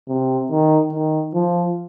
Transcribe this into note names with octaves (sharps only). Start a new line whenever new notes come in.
C3
D#3
D#3
F3